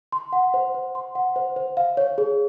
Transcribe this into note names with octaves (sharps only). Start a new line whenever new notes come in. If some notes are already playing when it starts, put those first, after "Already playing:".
C6
F#5
C5
C5
C6
F#5
C5
C5
F5
C#5
G#4